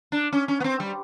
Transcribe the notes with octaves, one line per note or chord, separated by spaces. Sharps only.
D4
C#4
C#4
B3
C4
G3